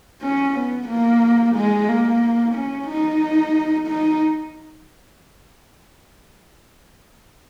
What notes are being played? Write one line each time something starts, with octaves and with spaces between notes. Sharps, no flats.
C#4
B3
A#3
G#3
A#3
C#4
D#4
D#4